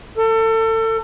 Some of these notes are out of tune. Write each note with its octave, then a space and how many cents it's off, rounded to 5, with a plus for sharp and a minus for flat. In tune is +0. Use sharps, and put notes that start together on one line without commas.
A4 +30